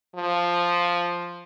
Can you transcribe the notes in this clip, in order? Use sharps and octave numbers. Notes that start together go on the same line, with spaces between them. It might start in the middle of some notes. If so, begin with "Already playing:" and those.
F3